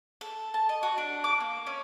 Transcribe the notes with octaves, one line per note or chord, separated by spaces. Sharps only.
A4
A5
D#5
F#4
D4
D6
A#3
C#4